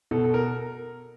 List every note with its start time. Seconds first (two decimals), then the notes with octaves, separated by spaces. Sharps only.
0.11 B2 A4
0.24 A4
0.34 A#4